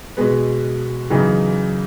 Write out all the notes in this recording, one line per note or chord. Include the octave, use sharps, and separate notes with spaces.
B2 G#3 B3
F#2 C#3 E3 B3 D#4